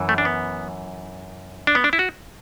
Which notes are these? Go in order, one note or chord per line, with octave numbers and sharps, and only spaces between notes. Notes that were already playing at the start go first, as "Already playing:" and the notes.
Already playing: F#2 E3
A3
D4
B3
D4
B3
D4
E4
F#4